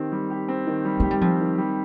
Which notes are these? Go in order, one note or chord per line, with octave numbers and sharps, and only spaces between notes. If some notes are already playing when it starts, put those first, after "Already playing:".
Already playing: D#3 C4 G4
G3
G4
C4
D#3
G3
A3 G4
G3
F3 C4
D#3
G3